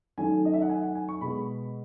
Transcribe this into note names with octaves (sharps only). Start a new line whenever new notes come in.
D#3 F#3 A3 C#4 G#5
D#5
E5
F#5
G#5
F#5
G#5
C#6
B2 G#3 B3 B5